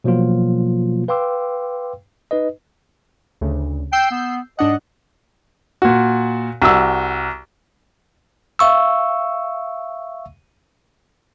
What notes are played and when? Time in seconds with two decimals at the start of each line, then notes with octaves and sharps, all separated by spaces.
0.04 B2 F3 F#3 A#3 F4
1.08 B4 F5 G5 C6 D6 E6
2.31 D#4 B4 D#5
3.41 D2 C#3
3.93 G5 E6 G6 C7
4.11 B3
4.59 G#2 D4 D#5 F#5
5.82 A#2 F#4
6.62 C2 F#4 E6
8.59 E5 F5 C#6 E6